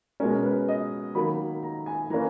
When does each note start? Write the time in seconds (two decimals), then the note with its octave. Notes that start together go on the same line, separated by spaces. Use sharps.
0.20 B2 G#3 C#4 A#4
0.44 B4
0.68 D#5
1.15 D#3 F#3 A#3 D#4 B5
1.63 A#5
1.86 G#5
2.10 E3 A#3 C#4 A#5